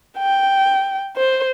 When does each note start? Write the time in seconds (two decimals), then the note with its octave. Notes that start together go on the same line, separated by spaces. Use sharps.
0.19 G5
1.16 C5